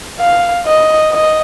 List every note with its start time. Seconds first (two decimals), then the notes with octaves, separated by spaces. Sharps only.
0.20 F5
0.66 D#5
1.12 D#5